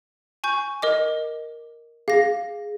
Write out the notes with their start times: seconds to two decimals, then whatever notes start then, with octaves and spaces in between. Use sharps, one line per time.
0.44 G#5 C#6 G6
0.82 A#4 D#5 D6
2.08 G#4 F5 A#6